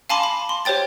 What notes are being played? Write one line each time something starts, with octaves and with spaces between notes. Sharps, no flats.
F5 G#5 A5 B5 C6 D6
B5
C6
G4 C5 C#5 G5 A6